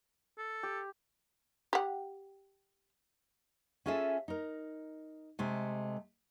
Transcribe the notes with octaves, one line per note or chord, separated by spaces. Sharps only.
A4
G4
G4 F#5
C#4 F4 G#4 A4 E5
D#4 A#4
C3 G#3 A3